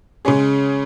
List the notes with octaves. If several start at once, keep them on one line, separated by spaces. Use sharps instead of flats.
C#3 G#3 C#4 G#4